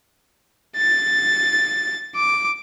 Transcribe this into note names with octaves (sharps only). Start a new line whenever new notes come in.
A6
D6